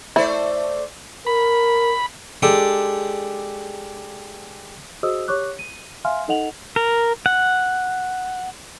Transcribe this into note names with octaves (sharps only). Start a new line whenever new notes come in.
A3 E4 C5 D5
A#4 B5
G#3 D4 G4 A4 D6
F#4 G#4 C5 D#5 D#6 E6
G4 C#5 C#6 D6 F#6
D#7
E5 F5 G#5 C6 F6
D#4 A4 D#5 F#5 F7 F#7
A#4
F#5